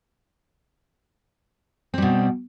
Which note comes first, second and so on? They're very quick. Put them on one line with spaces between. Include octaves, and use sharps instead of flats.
C4 G3 B2